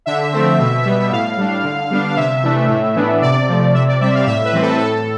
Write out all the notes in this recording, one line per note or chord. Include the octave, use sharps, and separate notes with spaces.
D3 E5
F3 A3 C4
B2
G3 B3
A2 F5
G3 D4
D3
G3 B3 D4
C3 E5
E3 A3 D4
A2
E3 B3 D4
C3 D5
F3 A3
C3 E5
D5
G3 C4 E5
F5
A2 E5
B4
E3 G3 C4
A4
A2 A4